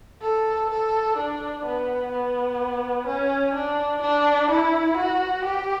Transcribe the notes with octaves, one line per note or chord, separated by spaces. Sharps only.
A4
A4
D4
B3
B3
C#4
D4
D4
E4
F#4
G4